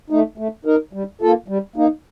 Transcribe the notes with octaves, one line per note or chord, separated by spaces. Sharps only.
A3 D#4
A3
D#4 A#4
G3
A#3 F4 A4
G3
A#3 D#4